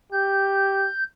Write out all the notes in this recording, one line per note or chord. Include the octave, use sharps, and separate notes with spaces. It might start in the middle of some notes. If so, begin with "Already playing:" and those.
G4 G6